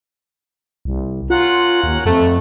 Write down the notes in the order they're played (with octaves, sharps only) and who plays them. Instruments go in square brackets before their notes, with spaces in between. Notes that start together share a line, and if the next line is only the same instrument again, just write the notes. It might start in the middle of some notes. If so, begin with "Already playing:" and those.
[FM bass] C2
[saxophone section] C#4 A#4 F#5 [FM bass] F4
[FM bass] D#2
[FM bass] F2 [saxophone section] A3